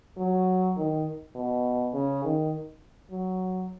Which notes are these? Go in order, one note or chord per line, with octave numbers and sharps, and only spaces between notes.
F#3
D#3
B2
C#3
D#3
F#3